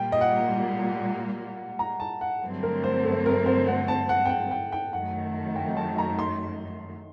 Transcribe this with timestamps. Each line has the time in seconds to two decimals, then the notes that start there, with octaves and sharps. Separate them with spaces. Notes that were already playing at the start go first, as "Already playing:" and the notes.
Already playing: A#2 G3 A#3 G5
0.12 D#5
0.21 F#5
1.79 A#5
2.00 A5
2.21 F#5
2.42 G2 D3 F#3 A3 C4
2.63 A#4
2.84 C5
3.04 A4
3.26 A#4
3.46 C5
3.67 F#5
3.88 A5
4.09 F#5
4.25 G5
4.29 F#5
4.51 G5
4.72 G5
4.93 F#2 D#3 A3 F#5
5.56 G5
5.77 A5
5.98 A#5
6.19 C6